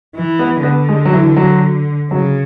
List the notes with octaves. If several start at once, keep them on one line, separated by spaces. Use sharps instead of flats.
E3
B3
D3 B3
G#3
F#3
E3
F#3
C#3 F#3